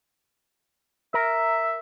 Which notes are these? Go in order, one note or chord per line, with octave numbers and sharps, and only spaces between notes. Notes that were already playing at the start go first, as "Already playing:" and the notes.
A#4 E5